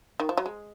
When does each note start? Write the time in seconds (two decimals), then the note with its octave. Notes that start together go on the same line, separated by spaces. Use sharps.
0.20 D#3
0.29 F3
0.37 F#3
0.46 G#3